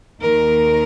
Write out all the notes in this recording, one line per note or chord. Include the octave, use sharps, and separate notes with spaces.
D#2 D#3 A#4